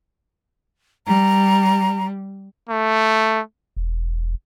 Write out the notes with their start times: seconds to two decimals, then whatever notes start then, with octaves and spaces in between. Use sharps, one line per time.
1.07 G3 A#5
2.69 A3
3.76 E1